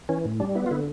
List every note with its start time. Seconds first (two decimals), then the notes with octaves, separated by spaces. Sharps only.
0.09 E3 C#4
0.25 A2
0.40 G3 D4
0.55 B3 E4
0.66 F4
0.71 D3 E4